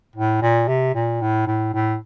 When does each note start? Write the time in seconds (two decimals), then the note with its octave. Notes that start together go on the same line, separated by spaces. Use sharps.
0.16 A2
0.42 A#2
0.68 C3
0.95 A#2
1.22 A2
1.47 A2
1.74 A2